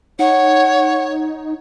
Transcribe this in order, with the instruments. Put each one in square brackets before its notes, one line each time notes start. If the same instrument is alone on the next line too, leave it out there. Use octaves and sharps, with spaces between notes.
[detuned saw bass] D#4 [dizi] C#5 [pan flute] F#5